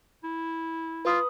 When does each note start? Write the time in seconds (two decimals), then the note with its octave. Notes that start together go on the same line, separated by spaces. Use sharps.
0.24 E4
1.05 F4 B4 D#6